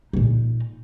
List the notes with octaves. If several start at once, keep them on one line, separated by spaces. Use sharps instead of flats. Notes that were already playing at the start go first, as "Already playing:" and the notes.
A#2 D#4